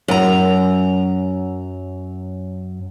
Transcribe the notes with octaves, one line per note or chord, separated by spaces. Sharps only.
F#2 A#5